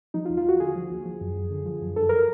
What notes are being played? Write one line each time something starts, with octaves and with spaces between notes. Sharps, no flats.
F3 D#4
F4
D#2
F4
D#2 F#4
D3 G#4
F3
D#2
F3
F#2
F#2
D3
F3
F#2
G2 A4
A#4